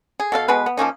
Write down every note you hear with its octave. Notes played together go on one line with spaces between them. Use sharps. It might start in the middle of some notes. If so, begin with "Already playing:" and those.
G#4
B2 A4 F5
B2 G#3 B3 B4
B3
F3 A#3 C#4 D#4